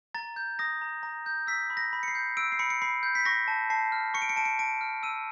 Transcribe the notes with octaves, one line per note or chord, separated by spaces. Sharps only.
A#5 A6
G6
D#6 A#6
A#5
A#5
G6
E6 B6
B5
A#6
B5
C#7
C7
G6
E6 D7
C7
B5 C#7
C#7
B5 C7
G6
B6
C#6 A#6
A5
A5 C7
F6
C#6 C#7
D7
C#7
A5 D7
C#7
A5 D7
F6
E6 D#7